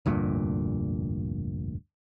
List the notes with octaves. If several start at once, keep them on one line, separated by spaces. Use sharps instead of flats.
F1 D2 G2 A#2